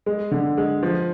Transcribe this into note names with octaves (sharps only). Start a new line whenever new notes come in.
G#3
D3
G#3
F3